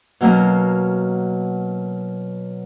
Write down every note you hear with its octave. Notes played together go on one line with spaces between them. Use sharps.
B2 F#3 A#3 C#4